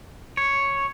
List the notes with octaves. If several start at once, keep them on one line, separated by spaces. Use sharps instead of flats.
C#5